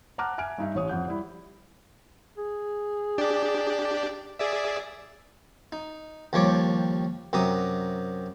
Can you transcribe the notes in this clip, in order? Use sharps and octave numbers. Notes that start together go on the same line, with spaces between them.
F#5 A5 A#5 D6 F6 F#6
E5 G#5 F6 D7
G2 D#4 E5
A1 C#5 D#6
F2 F#5 G6
G3 E4
G#4
D4 G4 D5
G#4 D5 E5
D#4
D#2 F3 G3 C#5 D6
F#2 C3 G4 A#5 D#6